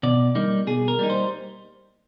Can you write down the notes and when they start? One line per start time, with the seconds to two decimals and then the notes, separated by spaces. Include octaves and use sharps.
0.03 B2 D5
0.35 G3 A#3 D#4
0.67 B2 G#4
0.88 A#4
0.99 G3 A#3 D#4
1.10 C5